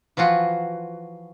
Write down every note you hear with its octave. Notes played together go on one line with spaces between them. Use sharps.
E3 F3 F4 F#4